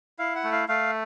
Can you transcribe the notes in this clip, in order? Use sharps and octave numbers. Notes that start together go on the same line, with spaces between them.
E4 F5
F#5
A3
F5
A3 F5